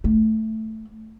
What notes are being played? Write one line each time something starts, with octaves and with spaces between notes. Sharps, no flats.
A3